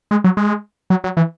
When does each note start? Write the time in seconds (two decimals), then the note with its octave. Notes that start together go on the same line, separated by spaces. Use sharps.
0.11 G#3
0.24 F#3
0.37 G#3
0.90 F#3
1.04 F#3
1.17 E3